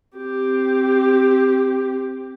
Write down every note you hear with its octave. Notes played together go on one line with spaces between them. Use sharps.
C4 G4